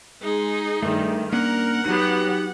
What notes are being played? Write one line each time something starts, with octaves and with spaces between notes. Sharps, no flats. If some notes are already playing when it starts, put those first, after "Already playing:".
G#3 D#4 G#4
G2 D#3 A3
A#3 C#4 D4 A#4 F#5
F#3 B3 D#4 G4